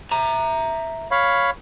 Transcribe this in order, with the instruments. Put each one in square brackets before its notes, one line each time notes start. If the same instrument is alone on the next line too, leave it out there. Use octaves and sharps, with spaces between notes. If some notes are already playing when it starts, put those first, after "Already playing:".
[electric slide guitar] E5 A#5
[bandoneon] C#5 F5 B5